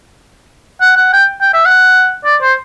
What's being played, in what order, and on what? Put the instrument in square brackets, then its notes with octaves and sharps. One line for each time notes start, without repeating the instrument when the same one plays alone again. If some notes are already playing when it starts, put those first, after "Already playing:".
[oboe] F#5
F#5
G5
G5
E5
F#5
D5
C5